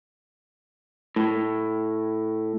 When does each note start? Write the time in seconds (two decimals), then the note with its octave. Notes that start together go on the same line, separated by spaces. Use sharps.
1.16 A2